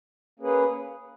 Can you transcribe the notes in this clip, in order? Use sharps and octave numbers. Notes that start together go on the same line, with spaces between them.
A#3 C#4 G#4 B4